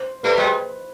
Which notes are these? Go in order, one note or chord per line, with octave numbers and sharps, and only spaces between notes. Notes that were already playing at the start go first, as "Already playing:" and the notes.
Already playing: C5
G3 A3 B4
F#3 G#3